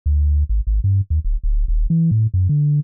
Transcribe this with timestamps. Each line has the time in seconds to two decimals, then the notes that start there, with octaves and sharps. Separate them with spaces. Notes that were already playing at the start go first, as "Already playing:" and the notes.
0.06 D2
0.49 G#1
0.67 G#1
0.84 G2
1.10 D#2
1.24 D1
1.43 D1
1.68 D#1
1.90 E3
2.11 A2
2.34 F#2
2.49 D3